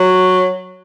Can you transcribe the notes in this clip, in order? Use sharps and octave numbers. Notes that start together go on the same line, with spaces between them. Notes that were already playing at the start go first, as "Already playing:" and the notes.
Already playing: F#3